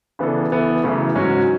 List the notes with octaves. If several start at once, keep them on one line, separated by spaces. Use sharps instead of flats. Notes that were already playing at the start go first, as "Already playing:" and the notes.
C#3 E3 B3 D4 A4
E3 B3 E4 A4
F#2 C#3 E3 A3
G#2 F#3 C#4 F#4